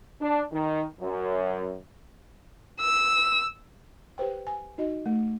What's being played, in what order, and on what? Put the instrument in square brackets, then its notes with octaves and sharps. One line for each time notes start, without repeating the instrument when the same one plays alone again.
[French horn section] D4
D#3
F#2
[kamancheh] E6
[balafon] G4 B4 C5 G5
G#5
D#4 F#4 D#5
A3